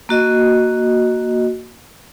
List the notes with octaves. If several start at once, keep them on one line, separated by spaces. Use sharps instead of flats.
A#3 F#4 D#5